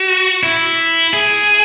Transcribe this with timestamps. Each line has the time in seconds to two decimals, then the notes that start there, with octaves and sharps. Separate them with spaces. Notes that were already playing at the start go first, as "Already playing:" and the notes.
Already playing: F#4
0.43 E4
1.14 G#4